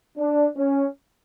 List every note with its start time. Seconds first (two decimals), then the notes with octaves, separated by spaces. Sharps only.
0.18 D4
0.57 C#4